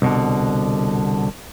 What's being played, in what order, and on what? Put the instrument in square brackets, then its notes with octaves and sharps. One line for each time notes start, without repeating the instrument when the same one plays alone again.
[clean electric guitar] C2 B2 D3